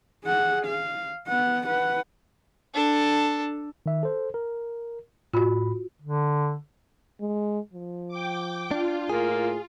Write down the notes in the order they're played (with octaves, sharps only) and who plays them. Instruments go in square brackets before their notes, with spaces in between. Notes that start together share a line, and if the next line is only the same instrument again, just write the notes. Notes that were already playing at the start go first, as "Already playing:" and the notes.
[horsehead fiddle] G#4 F#5
F5
B3 F#5
B4 F#5
[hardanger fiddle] D4 A4
[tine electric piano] D#3 E5
A4 C5
A#4
[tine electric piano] A2 B5 [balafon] F4 F#4
[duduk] D3
[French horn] G#3
F3
[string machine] G5 D6
[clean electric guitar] D4 [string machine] F4
[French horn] A2 [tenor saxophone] A#3 [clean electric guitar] G#4